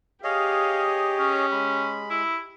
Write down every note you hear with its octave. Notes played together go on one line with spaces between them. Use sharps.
G4 G#4 C#5 D#5 F5
C#4
G#3 B5
E4